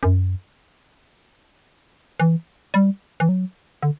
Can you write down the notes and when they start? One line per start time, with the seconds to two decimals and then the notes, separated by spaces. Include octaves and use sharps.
0.03 F#2
2.20 E3
2.74 G3
3.20 E3
3.29 F#3
3.82 D3